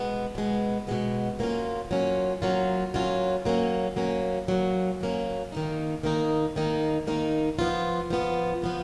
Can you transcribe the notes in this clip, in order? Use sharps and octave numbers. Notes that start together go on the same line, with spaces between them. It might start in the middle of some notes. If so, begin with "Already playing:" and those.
Already playing: B2 G#3 B3
B2 G#3 B3
B2 G#3 B3
F#3 A#3 C#4 F4
F#3 A#3 C#4 F4
F#3 A#3 C#4 F4
F#3 A#3 C#4 F4
F#3 A#3 C#4
F#3 A#3 C#4
F#3 A#3 C#4
F#3 A#3 C#4
D#3 A#3 D#4
D#3 A#3 D#4
D#3 A#3 D#4
D#3 A#3 D#4
F3 B3 F4
F3 B3 F4
F3 B3 F4